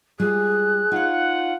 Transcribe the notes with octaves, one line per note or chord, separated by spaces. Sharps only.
G3 G#3 F4 G#4 F#6
D#4 F4 C#5 F#5